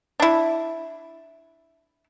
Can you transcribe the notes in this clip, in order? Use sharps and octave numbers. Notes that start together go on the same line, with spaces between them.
D4 E4